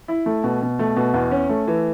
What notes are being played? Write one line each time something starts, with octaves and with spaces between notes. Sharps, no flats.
E4
A3
B2
B2
A3
B2
E2
C#4
A3
E3